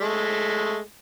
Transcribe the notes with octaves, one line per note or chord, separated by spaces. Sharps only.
G#3 A3